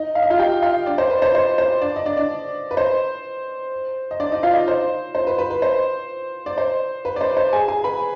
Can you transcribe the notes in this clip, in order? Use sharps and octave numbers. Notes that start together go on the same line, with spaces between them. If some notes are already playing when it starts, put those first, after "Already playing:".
Already playing: D#4 D#5
F5
D#5
F4 F5
G4 G5
F4 F5
D4 D5
C5
B4
C5
C5
C5
D4 D5
D#5
D4 D5
D4 D5
B4
C5
D#5
D4 D5
D#4 D#5
F4 F5
D#4 D#5
C5
C5
B4
B4
B4
C5
D5
C5
B4
D5
C5
C5
G#4 G#5
G#4 G#5
B4 B5